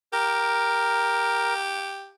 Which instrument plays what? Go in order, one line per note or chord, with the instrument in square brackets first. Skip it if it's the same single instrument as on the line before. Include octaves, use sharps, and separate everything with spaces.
[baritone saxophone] G4 [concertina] A#4